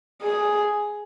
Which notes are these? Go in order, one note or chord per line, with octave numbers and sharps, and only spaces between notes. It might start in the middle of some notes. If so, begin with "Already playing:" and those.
G#4